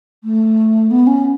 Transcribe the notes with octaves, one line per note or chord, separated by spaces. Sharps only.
A3
B3
C#4